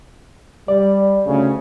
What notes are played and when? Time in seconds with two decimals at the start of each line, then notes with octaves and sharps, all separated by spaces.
0.68 G3 D5
1.26 D2 C#3